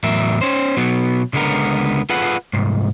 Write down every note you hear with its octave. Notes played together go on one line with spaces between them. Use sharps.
E2 A2 F#3 A#4 E5
C#4 C5
B2 F#3 B3
C#2 D3 G#3 B3 A#4
F4 G#4 A4 B4 F#5
C2 G#2